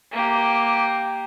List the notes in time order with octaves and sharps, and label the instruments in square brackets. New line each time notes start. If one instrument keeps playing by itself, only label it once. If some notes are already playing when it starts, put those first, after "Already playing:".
[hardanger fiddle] A#3 G4